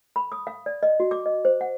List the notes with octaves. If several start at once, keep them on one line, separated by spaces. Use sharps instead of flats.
B5
D#6
F5
D5
D#5
F#4
D6
D#5
C5
F#5